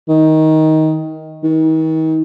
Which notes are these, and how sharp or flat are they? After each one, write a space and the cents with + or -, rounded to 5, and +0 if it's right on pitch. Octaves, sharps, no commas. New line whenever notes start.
D#3 +15
D#3 +40